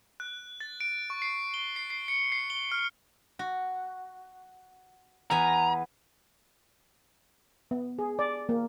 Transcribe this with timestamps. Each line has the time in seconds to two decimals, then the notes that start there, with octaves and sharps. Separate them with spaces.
0.20 F#6
0.60 A6
0.80 D7
1.10 C#6
1.22 C7
1.54 G7
1.76 C7
1.90 C7
2.08 C#7
2.32 C7
2.50 G7
2.72 F6
3.39 F#4
5.30 E2 B3 G#5 A#5
7.71 B3
7.99 G#4
8.19 D5
8.49 A#3